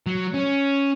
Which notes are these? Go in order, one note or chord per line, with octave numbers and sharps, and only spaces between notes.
F#3
C#4